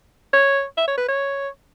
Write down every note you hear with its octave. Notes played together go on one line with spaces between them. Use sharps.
C#5
E5
C#5
B4
C#5